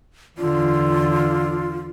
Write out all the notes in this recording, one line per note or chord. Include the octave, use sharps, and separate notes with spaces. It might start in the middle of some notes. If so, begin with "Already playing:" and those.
E2 D3 F4